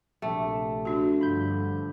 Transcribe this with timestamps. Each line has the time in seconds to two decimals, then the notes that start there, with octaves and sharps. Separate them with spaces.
0.22 A#1 C3 A3 G4
0.85 D4 F#4
1.19 G2 D3 F3 F4 B5 G6